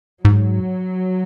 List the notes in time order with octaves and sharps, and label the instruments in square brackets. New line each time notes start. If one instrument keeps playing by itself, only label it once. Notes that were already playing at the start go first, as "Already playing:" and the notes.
[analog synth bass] G#2 [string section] F#3